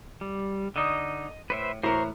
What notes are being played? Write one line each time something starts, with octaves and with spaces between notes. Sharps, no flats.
G3
D3 D#4 D#5
A2 B4 C5 E5
A2 E3 E4 A#4 C5 A#5 C#6